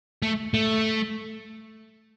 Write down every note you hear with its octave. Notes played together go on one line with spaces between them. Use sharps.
A3
A3